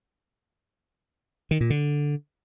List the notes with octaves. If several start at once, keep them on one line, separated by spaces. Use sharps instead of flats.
D#3
A#2
D3